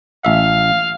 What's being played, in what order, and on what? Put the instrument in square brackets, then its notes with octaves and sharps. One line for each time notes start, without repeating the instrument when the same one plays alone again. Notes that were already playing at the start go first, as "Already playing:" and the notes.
[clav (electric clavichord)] A1 E5 [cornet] F5